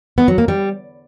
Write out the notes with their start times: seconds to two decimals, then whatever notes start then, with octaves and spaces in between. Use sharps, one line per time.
0.18 B3
0.28 F#3
0.38 A#3
0.48 G3